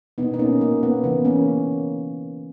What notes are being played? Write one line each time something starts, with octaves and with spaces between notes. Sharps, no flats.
B2 A#3 B3 D#4
D#4
A#3 C#4
A#3
B3
C#3 E3 A#3 B3
A#3 C#4